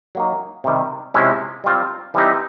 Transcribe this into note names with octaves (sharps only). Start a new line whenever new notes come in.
F#3 A#3 D#4
C3 D#3 G3
C3 F3 G#3 C#4 E4
G3 C4 F4
E3 G3 C4 D#4 G4